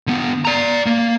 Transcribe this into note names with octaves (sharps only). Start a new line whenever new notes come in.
D3 B3
D5 A#5
A#3